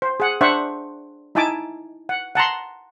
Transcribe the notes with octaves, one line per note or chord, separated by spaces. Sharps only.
C5
G#4 F#5
D4 C5 E5 F#5 C#6
D#4 E4 E5 G#5 A5 D6
F#5
F#5 A5 A#5 C6